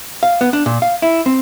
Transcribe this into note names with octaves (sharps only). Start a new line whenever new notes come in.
F5
B3
D4
A#2
F5
E4
C4